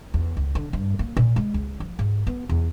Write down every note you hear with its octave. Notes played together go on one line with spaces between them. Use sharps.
E2
C#2
D3
G2
A#3
A#2
G#3
C#2
F3
G#2
B3
E2